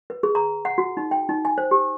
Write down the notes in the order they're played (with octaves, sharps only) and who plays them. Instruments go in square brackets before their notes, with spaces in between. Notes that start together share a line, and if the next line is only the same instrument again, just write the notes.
[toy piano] B4
G#4
A#5
F#5
F#4
D#4
G5
D#4
G#5
C5
G4